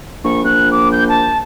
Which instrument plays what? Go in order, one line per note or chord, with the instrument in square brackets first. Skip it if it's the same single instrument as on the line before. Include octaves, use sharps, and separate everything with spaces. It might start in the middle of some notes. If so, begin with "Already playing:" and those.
[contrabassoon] A#1 [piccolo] C#6
[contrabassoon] A#1 [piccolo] F#6
[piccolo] D6
G6
A5